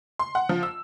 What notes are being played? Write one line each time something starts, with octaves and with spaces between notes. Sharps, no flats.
C6
F#5
F3
E6